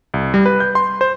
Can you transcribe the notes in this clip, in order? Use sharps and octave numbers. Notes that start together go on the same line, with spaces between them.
C2
G3
B4
G6
C6
C5